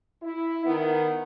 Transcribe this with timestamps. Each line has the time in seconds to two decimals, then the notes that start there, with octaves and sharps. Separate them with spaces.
0.22 E4
0.65 D#3 B3